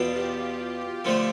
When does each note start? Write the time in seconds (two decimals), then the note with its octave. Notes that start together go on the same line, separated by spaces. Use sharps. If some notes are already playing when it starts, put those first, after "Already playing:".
Already playing: E2 B2 B3 D4 F4
0.16 G4
1.05 D3 F3 A3